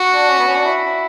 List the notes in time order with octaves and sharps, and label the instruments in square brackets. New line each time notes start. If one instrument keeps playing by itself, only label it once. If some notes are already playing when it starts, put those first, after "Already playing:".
Already playing: [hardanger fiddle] F#4
[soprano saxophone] D4
C#4
B3
C#4
D4
E4